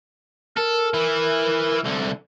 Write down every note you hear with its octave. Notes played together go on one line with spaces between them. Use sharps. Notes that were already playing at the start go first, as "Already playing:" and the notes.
A4 A#4
E3 E4
C2 D3